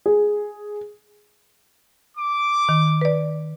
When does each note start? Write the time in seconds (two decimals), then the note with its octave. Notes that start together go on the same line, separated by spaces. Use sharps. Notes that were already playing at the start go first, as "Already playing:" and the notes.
0.06 G#4
2.17 D6
2.69 D#3
3.01 B4 D5